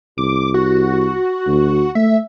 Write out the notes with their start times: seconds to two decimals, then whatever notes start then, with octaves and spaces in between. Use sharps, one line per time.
0.18 C2 D6
0.54 F#4
1.47 D2
1.95 A3 E5